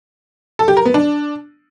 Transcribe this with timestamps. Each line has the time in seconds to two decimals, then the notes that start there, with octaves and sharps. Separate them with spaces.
0.59 A4
0.68 G4
0.77 A#4
0.85 B3
0.94 D4